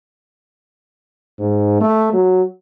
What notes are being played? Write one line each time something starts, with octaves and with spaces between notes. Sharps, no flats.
G#2
A3
F#3